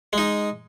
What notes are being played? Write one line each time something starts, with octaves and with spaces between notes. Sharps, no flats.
G#3 D#4